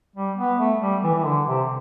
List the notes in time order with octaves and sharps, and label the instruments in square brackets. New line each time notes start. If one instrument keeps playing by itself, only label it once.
[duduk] G3
B3
A3
G3
E3
E3
D3
C3